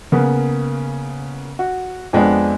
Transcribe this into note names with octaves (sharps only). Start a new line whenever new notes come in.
C#3 A#3 B3
F#4
F2 G#3 B3 D4